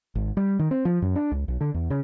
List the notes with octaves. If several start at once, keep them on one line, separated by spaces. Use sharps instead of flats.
G#1
G3
D#3
C4
F3
F#2
D4
C#2
B1
D3
E2
C#3